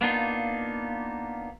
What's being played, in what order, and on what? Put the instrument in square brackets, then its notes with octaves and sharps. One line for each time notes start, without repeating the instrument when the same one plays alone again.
[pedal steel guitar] A#3 B3 D4 D#4 F4